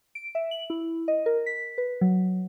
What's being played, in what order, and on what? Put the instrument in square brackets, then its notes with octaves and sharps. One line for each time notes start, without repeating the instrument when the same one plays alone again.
[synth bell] D7
E5
F#7
E4
D#5
A#4
B6
B4
F#3